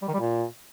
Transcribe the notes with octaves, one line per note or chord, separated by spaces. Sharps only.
G3
D#3
G3
A#2